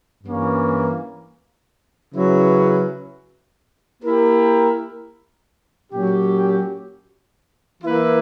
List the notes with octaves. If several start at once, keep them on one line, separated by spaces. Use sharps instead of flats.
G2 E3 A#3 C#4
C#3 F#3 C#4 E4 B4
A#3 E4 G4 A#4
A#2 F#3 C#4 G4
E3 A#3 E4 B4